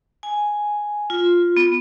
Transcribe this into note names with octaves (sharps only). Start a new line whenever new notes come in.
G#5
F4
B3